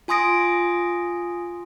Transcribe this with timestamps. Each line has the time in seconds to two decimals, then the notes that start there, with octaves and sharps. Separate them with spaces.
0.08 F4 G#5 C6 D#6 A#6 D7